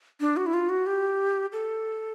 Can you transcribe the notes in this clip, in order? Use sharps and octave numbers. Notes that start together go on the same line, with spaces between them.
D4
F#4
E4
F4
F#4
G4
A4